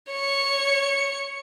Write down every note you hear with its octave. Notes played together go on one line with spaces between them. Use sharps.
C#5 C#7